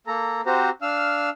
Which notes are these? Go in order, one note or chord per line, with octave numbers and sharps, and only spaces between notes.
A#3 A4 A#5
C4 F#4 G4 C5 A#5
D4 F5 E6 F6